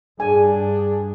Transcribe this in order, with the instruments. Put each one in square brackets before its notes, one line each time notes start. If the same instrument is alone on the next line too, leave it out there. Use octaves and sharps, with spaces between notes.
[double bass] G2 [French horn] D4 [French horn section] G#4 [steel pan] G#5